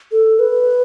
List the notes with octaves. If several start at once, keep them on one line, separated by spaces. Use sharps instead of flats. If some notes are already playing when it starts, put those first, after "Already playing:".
A4
B4